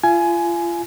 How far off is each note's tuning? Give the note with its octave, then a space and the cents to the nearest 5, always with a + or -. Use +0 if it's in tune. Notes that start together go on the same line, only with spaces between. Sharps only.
F4 -30 G#5 +15